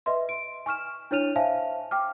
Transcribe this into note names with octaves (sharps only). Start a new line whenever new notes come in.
B4 D#5 E5 C6
D7
G#5 C#6 F6 E7
D4 E4 C#5 F6 D#7 F7
C5 E5 F5 G#5 A5
G5 D6 F6